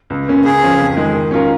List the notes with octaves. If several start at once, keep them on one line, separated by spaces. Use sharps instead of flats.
C#2
C#3 A#3 C#4
C#2 G#4
C#3 F3 C#4 F4
F2
D#3 G#3
D#3
C#4 F4 A#4